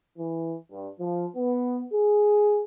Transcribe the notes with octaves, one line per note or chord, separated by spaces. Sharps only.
E3
G2
F3
B3
G#4